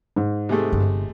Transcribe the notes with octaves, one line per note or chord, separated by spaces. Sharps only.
G#2
C3 G#3 A3
G1